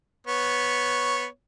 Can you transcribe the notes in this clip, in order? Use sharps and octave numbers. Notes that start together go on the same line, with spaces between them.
B3 C#5